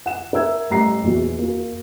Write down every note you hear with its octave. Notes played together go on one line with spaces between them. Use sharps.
F#5 E7
A#4 E5 E6 G#6
A1 G3 A#5 C7
A#1 E2 E3 F#4
A#3 F#4